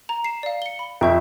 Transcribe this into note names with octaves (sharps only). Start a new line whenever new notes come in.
A#5
C7 E7
D5 F5
C#7 G7
B5
F2 E5 G5 C#6 G6